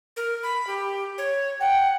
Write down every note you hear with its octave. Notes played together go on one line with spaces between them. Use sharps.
A#4
B5
G4
C#5
F#5 G5